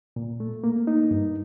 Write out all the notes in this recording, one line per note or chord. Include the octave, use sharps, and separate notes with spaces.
A#2
A3
A#3
D#4
G2